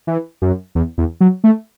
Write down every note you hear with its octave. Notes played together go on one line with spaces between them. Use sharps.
E3
F#2
E2
E2
F#3
A3